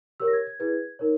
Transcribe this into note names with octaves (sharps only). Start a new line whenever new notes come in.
G4 A#4 C#5 E6
A#6
G#6
G#6
E4 G#4 B4 G#6
D#4 A#4 C#5